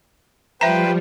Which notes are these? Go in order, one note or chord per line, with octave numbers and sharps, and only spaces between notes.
F3 G3 B4 C5 E5 G5 A#5